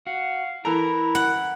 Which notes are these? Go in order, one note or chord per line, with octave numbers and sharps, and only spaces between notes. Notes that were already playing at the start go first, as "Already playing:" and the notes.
F#4 F5
E3 E4 A4 A#4 A#5
F#5